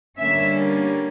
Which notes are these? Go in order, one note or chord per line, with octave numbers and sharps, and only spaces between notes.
D3 G3 A#3 C#4 E5